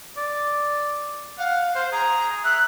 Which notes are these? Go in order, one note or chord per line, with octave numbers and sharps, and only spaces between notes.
D5
F5 F#5
C5 F5
G#4 A#5
E5 F#6